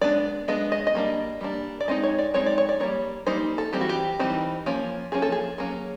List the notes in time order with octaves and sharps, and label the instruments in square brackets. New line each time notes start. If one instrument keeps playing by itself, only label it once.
[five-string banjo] G#3 B3 D4 D5
G#3 B3 D4 D#5
D#5
D#5
G3 A#3 D4
G3 A#3 D4
D5
G#3 C4 D#4 D#5
C#5
D5
G#3 C4 D#4 C#5
D5
C#5
D5
G3 A#3 D#4 C#5
G3 A#3 D#4 C5
A4
E3 G3 C4 D#4 G4
F#4
G4
E3 G3 C4 D#4
F3 A#3 C#4
F3 A#3 C#4 G#4
A4
G#4
F#3 A#3 C#4